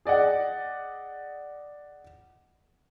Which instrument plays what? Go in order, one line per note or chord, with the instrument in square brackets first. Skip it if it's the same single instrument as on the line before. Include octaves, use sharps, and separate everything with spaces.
[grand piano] G#4 D5 D#5 F#5